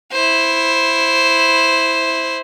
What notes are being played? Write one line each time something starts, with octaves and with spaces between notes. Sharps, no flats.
E4 C5